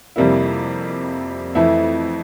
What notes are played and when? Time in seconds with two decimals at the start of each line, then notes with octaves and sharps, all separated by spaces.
0.16 F2 C3 G3 A#3 E4
1.55 F2 E3 A3 E4